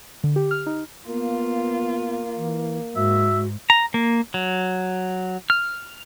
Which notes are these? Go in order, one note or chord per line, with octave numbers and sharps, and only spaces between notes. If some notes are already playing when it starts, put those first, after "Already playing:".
D3
G4
F6
D#4
A#3 B3 F4
E3
G#2 F#4 E5
A#5
A#3
F#3
F6